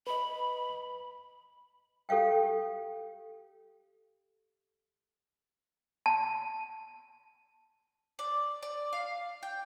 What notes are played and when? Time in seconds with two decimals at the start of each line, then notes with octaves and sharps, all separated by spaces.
0.07 B4 D#5 B5
2.09 G4 A4 C#5 F5 G5
6.06 A5
8.19 D5
8.63 D5
8.93 F5
9.43 G5